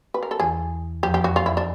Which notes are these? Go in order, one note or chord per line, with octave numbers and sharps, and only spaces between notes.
B4
A#4
A4
E2 E3 G#4
F2 F3 G4
G4
F#4
F4
E4
D4